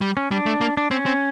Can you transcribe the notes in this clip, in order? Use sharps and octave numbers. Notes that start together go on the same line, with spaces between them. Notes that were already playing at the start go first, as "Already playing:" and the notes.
G3
C#4
G3 D4
A3
A#3
D4
C4 C#4
C4